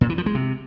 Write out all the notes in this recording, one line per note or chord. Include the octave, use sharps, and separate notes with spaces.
A#2
E3
F3
G#3
C3